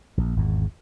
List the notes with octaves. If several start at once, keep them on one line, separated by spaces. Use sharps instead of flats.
A#1
G#1 E2